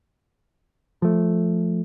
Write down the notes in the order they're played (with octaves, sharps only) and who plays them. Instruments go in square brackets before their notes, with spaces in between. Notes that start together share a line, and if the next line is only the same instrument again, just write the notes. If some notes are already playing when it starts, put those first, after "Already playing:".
[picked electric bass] F3 A3